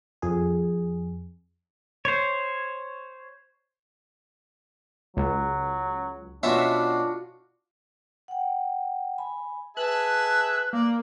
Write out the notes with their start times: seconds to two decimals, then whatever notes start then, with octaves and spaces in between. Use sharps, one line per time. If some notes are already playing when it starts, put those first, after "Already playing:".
0.22 F2 G#4
2.05 C5 C#5
5.17 C#2 F#3
6.43 B2 C#4 D4 F4 F#4 E5
8.28 F#5 G5
9.18 G#5 B5
9.77 G#4 B4 E5 A5 F#6
10.73 A#3 D5